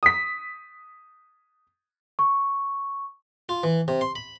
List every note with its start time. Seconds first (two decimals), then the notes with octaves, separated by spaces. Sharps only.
0.03 D#6 B6
2.19 C#6
3.49 F4
3.63 E3
3.88 C3
4.01 C6
4.16 B5